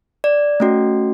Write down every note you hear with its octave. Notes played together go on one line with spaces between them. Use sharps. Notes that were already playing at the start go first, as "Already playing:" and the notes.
D5
A3 C#4 F#4